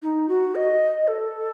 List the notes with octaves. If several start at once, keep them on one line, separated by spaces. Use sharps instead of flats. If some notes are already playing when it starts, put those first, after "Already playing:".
D#4
F#4
D#5
A4